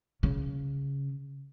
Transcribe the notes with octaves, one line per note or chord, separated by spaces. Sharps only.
C#3 C#4